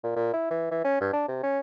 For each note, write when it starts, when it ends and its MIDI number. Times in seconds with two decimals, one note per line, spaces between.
0.03 0.16 46
0.16 0.28 46
0.33 0.46 64
0.50 0.68 52
0.71 0.81 52
0.84 0.98 61
1.01 1.10 43
1.13 1.24 62
1.28 1.40 48
1.43 1.60 61